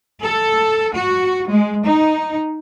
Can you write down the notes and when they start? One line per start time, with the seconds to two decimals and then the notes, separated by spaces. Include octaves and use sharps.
0.22 A4
0.95 F#4
1.48 G#3
1.85 D#4